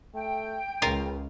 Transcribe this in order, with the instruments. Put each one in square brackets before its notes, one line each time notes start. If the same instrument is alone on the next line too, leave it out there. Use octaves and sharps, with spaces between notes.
[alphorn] A3 [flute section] G5
[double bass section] C#2 [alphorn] C#3 [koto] F4 A#4 F5